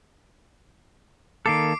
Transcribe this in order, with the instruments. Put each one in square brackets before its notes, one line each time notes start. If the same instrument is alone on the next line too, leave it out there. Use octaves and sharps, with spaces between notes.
[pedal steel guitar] D#3 A#3 A4 [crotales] D6 C7 D7